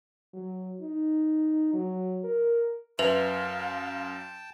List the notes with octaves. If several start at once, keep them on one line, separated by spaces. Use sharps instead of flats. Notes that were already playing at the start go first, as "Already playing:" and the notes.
F#3
D#4
F#3
A#4
F#2 B4 E5 F5 G5 A5 F7